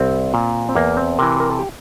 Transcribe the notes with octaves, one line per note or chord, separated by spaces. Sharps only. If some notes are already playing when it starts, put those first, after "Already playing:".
Already playing: C2 C4
A#2
C4
E2 A#3
C4
C3 E3 A#4
A#4
A4
G4